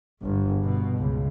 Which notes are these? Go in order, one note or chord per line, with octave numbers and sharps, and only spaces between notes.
G1
B2
C#2